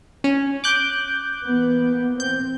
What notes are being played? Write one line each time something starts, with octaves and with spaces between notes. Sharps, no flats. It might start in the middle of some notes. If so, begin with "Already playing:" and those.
C#4
D6 F#6 G6
E3 A#3 B3
C4 G6